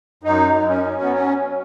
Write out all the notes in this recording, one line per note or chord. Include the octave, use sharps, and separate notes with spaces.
F#2 D#4
F#2
C#4
F#3
B3
C#4